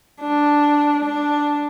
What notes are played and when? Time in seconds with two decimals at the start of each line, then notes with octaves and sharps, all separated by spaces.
0.21 D4
1.05 D4